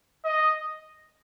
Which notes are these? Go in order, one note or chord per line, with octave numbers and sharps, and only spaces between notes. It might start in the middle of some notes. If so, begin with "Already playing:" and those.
D#5